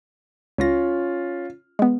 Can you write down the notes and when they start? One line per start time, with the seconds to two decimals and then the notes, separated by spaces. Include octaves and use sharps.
0.58 C#2 C#4 F4 A#6
1.79 G#3 B3